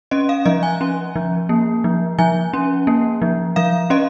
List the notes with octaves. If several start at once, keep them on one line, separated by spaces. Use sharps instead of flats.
C#4 D#5
F5
F3 D#5
G#5
C#4
F3
A#3
F3
F3 G#5
C#4
A#3
F3
F3 F5
C#4 D#5